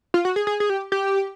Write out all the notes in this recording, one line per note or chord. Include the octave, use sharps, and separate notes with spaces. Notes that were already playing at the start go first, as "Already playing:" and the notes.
F4
F#4
G#4
G#4
G#4
G4
G4